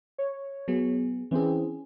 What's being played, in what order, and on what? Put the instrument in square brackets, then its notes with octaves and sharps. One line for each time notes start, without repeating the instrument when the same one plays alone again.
[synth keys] C#5
[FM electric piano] F#3 B3 G#4
[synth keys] E3 C4 [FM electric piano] C#4 G#4